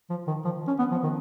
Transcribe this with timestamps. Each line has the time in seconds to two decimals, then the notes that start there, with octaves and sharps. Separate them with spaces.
0.10 F3
0.27 D#3
0.45 F3
0.67 C#4
0.79 B3
0.91 F3
1.03 D#3